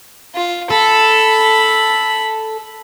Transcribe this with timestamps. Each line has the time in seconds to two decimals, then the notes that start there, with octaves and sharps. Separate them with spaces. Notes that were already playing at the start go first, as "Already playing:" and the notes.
0.35 F4
0.70 A4 B5